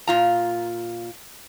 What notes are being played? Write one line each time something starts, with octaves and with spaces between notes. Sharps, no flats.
A#2 F4 A#5